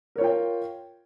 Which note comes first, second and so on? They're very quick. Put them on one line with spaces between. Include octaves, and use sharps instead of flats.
A#4 C#5 F4 G5